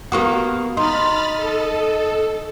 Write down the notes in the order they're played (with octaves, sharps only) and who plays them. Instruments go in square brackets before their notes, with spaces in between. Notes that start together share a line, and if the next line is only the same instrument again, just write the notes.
[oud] A#3 B3 F#4 [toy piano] G4 C#6 D#6
[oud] D#4 [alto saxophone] D#5 [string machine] B5 F6 A6 [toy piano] C6
[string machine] A4